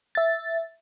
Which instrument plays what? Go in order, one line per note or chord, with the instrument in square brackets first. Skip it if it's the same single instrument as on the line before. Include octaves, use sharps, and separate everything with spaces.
[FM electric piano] E5 A6